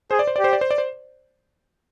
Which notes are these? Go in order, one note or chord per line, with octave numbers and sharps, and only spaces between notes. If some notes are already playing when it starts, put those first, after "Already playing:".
G#4 C5
D5
C5
D5
G4 C5
D5
C5
D5
C5